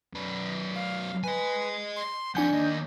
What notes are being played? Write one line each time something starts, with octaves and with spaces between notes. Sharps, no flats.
F#2 B4
F5
B4 D#5 G#5
C6
F2 D4 F#5 G#5 G6
D#2 D#5